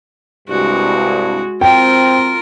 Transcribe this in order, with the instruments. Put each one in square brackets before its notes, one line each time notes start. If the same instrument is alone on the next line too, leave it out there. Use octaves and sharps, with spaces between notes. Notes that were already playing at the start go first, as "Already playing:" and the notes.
[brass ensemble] C2 G2 [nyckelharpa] G#3 F#4
[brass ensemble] C4 [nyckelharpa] F4 A#4 [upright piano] G5